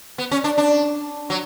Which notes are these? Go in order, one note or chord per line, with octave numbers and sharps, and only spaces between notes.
B3
C#4
D4
D4
F#3